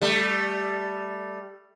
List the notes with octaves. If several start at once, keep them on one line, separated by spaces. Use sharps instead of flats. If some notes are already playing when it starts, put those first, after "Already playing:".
G3 A3